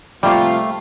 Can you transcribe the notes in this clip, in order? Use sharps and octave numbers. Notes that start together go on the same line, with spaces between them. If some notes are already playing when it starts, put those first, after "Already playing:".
C3 F3 G3 A3 A#3 F4